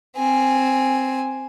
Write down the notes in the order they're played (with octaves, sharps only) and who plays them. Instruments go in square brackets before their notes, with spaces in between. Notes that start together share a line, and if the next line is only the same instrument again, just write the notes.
[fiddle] C4 G#5